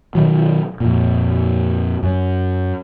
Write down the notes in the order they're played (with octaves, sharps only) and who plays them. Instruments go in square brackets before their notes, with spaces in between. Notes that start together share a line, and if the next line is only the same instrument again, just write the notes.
[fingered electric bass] B2 D#3 F#3
F2 A#2
F#2